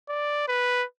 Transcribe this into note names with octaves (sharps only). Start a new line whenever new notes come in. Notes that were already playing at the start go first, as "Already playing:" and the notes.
D5
B4